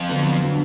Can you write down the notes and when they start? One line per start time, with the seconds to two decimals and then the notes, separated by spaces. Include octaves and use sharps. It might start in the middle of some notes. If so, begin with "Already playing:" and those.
Already playing: F2
0.09 D3 F#3 B3 D4
0.43 D3 F#3 B3 D4